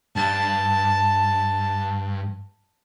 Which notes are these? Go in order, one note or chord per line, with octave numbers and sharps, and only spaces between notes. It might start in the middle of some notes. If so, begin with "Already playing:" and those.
G2 A5